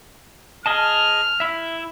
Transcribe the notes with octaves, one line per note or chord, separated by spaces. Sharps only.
G#4 D#5 A5 F6
E4 E5